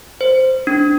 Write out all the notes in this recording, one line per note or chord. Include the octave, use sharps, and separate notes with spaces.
C5
D4